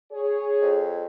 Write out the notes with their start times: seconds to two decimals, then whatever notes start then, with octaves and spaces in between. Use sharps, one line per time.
0.12 G#4 C#5
0.62 F2